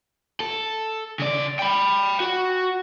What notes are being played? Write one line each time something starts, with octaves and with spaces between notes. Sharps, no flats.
A4
C#3 D5
G5 B5
F#4